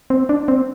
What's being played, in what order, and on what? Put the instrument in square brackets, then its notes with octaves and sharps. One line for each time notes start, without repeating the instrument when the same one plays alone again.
[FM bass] C4
D4
C4